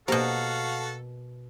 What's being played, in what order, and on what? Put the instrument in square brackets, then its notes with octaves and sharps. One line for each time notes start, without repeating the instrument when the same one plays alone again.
[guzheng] B2 A#4 [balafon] A#3 G4 C5 [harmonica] F#4 A4 F5